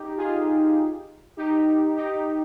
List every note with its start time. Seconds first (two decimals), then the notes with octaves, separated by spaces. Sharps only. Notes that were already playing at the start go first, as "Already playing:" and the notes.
Already playing: D#4 G4
0.17 F4 G#4
1.37 D#4 G4
1.96 D#4 G4